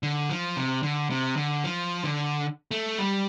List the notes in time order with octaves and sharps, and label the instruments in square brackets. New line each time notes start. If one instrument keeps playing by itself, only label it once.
[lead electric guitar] D3
F3
C3
D3
C3
D3
F3
D3
A3
G3